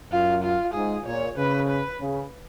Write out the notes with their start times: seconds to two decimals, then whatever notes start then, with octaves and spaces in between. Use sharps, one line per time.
0.11 F#2 F4
0.43 F4
0.74 G#2 G#4
1.06 A#2 C#5
1.37 C#3 B4
1.68 B4
2.00 C#3